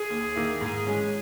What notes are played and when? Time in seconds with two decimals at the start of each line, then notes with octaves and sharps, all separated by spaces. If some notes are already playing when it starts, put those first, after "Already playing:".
Already playing: G#4
0.10 D#2
0.36 D#3 A#3 E4
0.61 G#2
0.86 E3 G#3 C#4